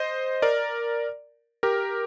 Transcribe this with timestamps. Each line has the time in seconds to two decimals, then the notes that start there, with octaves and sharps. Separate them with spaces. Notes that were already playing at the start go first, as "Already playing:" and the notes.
Already playing: C5 D#5
0.42 A#4 D5
1.63 G4 A#4